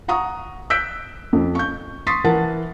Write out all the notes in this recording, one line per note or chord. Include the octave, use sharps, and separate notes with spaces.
F#5 A#5 C#6 D#6
E6 F#6 G6 B6 D7
F2
C#6 G6
C6 C#6 D#6 A6 B6 C7
E3 A#4 F#5 A5 A6